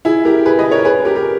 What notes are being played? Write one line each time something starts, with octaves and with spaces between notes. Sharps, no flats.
E4 G#4
G4 A#4
G#4 B4
B4 D#5
A#4 C#5
G#4 B4
G4 A#4
G4 A#4